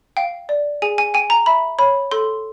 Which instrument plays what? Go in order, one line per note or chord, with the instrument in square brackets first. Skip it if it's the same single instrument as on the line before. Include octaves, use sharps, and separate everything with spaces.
[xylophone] F5 G5
D5
G#4 G#5
G#5
G5 G#5
A#5
E5 B5
C#5 B5
A4 C6